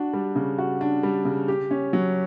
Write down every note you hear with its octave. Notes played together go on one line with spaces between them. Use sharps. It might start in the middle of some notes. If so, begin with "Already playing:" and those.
Already playing: D4 F#4
G3
C#3
F#4
D4
G3
C#3
G4
C#4
F#3